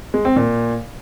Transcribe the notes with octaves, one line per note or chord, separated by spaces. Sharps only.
G#3
C4
A#2